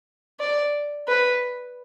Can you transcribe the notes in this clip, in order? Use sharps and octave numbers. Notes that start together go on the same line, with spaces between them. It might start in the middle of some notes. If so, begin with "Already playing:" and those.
D5
B4